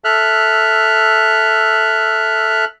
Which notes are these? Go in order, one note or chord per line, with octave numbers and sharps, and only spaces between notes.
A4 E5 F6 F#6